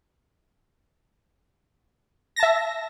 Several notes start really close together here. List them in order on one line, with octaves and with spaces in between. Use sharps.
A#6 A5 E5